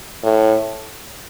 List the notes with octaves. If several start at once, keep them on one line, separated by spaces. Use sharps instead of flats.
A2